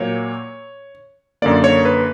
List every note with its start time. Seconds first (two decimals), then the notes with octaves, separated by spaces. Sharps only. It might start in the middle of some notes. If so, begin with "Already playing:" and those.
Already playing: A#2 F#3 A#3 C#5
1.42 F#2 D3 A#3 D5
1.64 C#5
1.85 B4